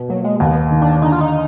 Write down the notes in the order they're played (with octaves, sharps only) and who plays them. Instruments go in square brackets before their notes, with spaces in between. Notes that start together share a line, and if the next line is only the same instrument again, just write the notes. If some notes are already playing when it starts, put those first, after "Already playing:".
Already playing: [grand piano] B2
[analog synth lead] F#3 [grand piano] A#3
[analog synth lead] G#3
[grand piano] D#2 [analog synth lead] B3
[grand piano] D#3
[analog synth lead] D4
[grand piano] D3 [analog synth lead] D#4
[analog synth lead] F4
D#4